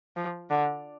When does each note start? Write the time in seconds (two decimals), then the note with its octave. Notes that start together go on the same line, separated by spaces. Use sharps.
0.16 F3
0.50 D3